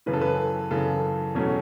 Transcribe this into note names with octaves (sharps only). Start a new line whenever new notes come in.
F#2 C#3 E3 B4
A4
B4
F#2 C#3 E3 A4
E2 B2 F#3 A3 C#4